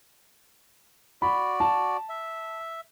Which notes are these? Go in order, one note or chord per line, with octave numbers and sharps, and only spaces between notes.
F#4 D5 B5
A5
E5